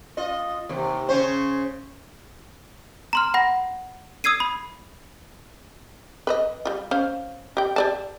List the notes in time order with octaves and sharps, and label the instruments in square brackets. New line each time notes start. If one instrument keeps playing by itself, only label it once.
[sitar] F4 D#5
D#2 C3
C#3 C#4 C5
[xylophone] A#5 C6 F6
F#5 B5 A#6
D#6 E6 G#6 C7 D#7
B5
[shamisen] B4 C5 D#5
G3 F4
C#4 C5 F5
G4 G5
G4 D5 A5